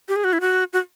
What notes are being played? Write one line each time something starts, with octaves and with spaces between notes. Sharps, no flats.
G4
G#4
F#4
E4
F#4
F#4